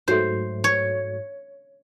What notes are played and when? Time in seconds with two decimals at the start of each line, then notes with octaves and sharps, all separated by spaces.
0.08 G#2 F#3 A3 C5
0.64 C#5